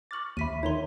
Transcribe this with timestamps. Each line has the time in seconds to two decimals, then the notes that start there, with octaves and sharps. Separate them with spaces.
0.11 C#6 D6 F6 A6 F#7
0.37 D#2 E5 B5 B6 D#7
0.63 D#3 D#4 C#5 A#5 C6